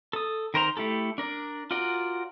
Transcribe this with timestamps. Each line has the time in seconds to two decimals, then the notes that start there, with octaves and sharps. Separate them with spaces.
0.13 A4 D#6
0.54 D#3 A#4 C5 A#5
0.77 A3 E4 G4 A4
1.18 D4 A#4 D5
1.71 F4 F#4 A#4 D5